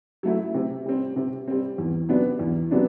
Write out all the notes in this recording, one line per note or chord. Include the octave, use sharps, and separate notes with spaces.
F#3 A3 E4
C3
G3 C4
C3
G3 C4
E2
C3 F#3 B3 D4
E2
C3 F#3 B3 D4